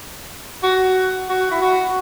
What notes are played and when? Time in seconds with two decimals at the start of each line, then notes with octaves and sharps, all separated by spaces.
0.63 F#4
1.29 F#4
1.51 E4
1.62 F#4